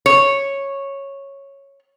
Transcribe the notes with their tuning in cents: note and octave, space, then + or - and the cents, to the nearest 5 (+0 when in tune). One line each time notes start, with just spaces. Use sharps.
C#5 -5